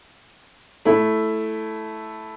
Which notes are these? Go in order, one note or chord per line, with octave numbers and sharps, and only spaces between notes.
A3 E4